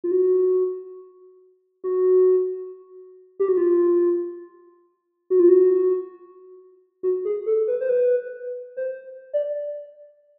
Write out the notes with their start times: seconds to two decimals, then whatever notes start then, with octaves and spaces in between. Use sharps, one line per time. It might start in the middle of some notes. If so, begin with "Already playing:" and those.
0.04 F4
0.11 F#4
1.84 F#4
3.40 G4
3.48 F#4
3.57 F4
5.30 F#4
5.39 F4
5.48 F#4
7.03 F#4
7.25 G#4
7.46 A4
7.68 B4
7.81 C5
7.89 B4
8.77 C5
9.33 D5